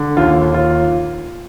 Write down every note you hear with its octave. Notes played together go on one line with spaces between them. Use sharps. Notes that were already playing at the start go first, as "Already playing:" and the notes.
Already playing: D3
D#2 F4
D#2
F4